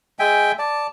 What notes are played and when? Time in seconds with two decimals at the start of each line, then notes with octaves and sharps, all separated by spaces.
0.19 G#3 E5 G5 G#5
0.59 D5 A5